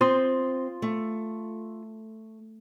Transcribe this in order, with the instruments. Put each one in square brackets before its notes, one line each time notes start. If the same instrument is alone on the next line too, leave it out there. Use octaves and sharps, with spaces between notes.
[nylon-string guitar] C4 [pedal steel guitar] F4 C6 D#6
[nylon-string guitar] A3